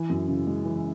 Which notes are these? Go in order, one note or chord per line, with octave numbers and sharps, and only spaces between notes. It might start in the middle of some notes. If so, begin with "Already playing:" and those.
Already playing: E3
F#2
C#3
G#3
E3